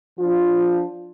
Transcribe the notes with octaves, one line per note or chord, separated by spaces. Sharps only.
F3 D4 F4